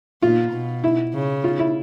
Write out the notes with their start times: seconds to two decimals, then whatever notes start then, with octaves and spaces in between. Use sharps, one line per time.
0.22 A#2 F4
0.53 B2
0.84 E4
1.14 C#3
1.44 F4
1.59 E4